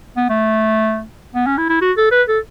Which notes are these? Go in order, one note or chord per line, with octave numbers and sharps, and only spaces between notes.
B3
A3
B3
C#4
E4
E4
F#4
A4
B4
A4